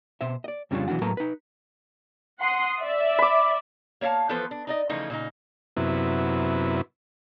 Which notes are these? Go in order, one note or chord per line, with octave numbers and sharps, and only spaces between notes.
B2 C5 E5
D5 D#5
F2 C#3 G3 D4 F4 C#5
B1 E3 G#3 D4 F#4 F#5
A2 F#3 A#3 A4 B4 A#5
D#4 B4
F#5 C6 D#6
D5 E5
B5 D6
A#3 C#5 E5 F5 A5
E3 F3 B3 A4 B4 C5
D4
D#4 D5 D#5
C#3 E3 F3 A3 D#4
A#2 C#3 D#4
F#2 C3 B3 E4